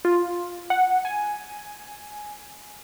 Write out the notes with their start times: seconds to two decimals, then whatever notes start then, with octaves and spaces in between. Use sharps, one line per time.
0.05 F4
0.70 F#5
1.05 G#5